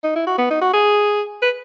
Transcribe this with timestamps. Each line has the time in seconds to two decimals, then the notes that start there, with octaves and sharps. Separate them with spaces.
0.04 D#4
0.16 E4
0.26 F#4
0.38 B3
0.50 D#4
0.61 F#4
0.73 G#4
1.42 B4